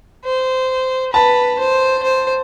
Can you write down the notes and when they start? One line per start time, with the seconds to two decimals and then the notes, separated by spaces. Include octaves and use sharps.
0.25 C5
1.13 B4 A5
1.59 C5
2.03 C5